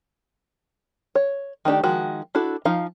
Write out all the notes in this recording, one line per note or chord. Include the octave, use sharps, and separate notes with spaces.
C#5
D#3 A3 D4 G4
D#3 F3 G#3 F#4
D4 E4 F#4 A4
F3 D#4 F5